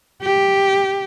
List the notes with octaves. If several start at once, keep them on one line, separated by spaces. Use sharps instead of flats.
G4